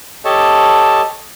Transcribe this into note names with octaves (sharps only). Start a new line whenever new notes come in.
G4 A4 C#5 D#5 A5